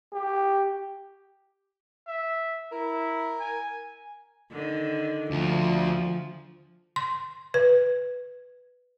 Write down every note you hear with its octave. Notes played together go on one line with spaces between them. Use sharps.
G4
E5
E4 A#4
G#5
D3 D#3
D2 F3
C6
B4